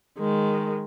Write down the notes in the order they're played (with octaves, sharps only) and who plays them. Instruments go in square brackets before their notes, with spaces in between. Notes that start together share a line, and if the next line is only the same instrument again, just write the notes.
[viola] D#3 G#3